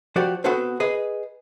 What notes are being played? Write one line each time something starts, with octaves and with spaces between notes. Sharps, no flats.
F3 F#4 G4 C5 D5
B3 C4 F#4 A4 B4 C5
G#4 B4 D#5